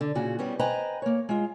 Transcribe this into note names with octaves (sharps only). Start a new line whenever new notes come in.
D3
A#2 C#3 F#4
G3 B3 C#4
B4 C5 D#5 G5 G#5 A#5
A#3 C#5
G#3 F4